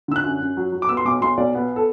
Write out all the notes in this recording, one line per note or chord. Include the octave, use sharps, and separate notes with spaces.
D3 E6
F#6
F#2
F#2
F#3
F#3
D6
B3 E6
C6
B1 D6
B1 C6
B1 D5
B3
A4